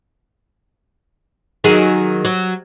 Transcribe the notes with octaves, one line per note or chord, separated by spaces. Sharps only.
D#3 F#3 G#4
F#3